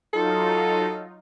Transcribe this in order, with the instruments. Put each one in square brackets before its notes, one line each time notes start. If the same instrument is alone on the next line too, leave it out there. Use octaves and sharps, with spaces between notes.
[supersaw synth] F#3 D#4 F4 [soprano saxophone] A4